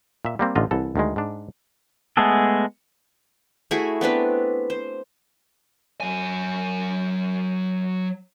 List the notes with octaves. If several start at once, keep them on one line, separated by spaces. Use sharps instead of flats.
A#2 E5
G3 A#3 C4
A1 D3 F4 D#5
C2 E3 A4
D2 D#3 G#3
G#2 D4
G#3 A3 B3 G#4 A4
A3 E4 F#4 G#4
B3 C4 D4 B4
C5
F#3 G#5